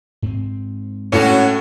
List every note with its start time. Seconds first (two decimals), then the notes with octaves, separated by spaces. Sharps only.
0.22 G#2 C4
1.12 A2 C#4 F#4